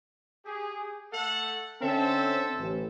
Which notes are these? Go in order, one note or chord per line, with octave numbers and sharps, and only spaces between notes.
G4 G#4
A3 A4 F#5
D3 C4 C#4 A4 C5 E5
A1